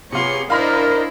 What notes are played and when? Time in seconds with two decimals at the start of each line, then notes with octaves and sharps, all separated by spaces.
0.12 C3 B3 F4 G#4 C#5 C6 C#7
0.50 D4 E4 A#4 C5 D#5 F5 B5 F6